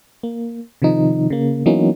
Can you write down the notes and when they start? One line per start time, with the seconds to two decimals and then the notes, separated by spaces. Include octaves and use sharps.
0.23 A#3
0.82 C3 D#3 F3 D#4
1.30 C#3 A#3
1.66 E3 F#3 A#3 B3 C#4 D#4